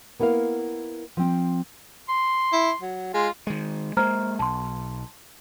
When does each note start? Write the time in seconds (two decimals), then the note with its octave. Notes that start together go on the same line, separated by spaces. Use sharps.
0.20 A#3 B3 E4 A#4 F5
1.17 F3 C4
2.09 C6
2.53 E4
2.81 F#3
3.14 G#3 F4
3.47 D#3 G#3
3.97 G#3 A#3 C5 A#5 F6
4.39 B1 A5 C6